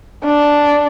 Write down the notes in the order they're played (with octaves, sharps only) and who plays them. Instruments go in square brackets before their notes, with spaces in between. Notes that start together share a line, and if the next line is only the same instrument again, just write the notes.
[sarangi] D4